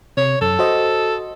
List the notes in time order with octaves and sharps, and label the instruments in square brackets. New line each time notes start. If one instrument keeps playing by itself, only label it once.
[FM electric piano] C3 [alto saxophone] C#5
[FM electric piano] F#2 [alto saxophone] A4
[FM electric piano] F#4 C5 D#5